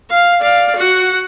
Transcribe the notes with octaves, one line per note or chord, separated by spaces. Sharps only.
F5
D5 F5
F#4 F#5